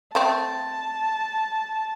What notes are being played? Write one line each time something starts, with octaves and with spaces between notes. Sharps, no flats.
A3 C4 A5